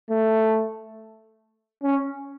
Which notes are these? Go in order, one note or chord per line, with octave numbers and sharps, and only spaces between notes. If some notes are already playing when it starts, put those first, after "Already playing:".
A3
C#4